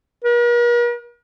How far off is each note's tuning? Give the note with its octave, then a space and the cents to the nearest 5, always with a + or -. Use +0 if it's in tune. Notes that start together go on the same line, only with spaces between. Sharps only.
A#4 +45